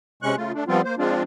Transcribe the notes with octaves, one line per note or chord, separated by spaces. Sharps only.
C3 G#3 C#4 C#6 F#6
C#3 A3 F4
A3 D4
F3 G3 B3 C4 F4
A#3 C5
F3 G#3 C4 D4 F4